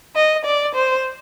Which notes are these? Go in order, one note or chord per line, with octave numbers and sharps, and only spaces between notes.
D#5
D5
C5